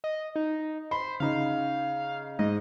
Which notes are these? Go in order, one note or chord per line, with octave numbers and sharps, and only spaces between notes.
D#5
D#4
C5 B5
C#3 D#4 F5
G#2 D#5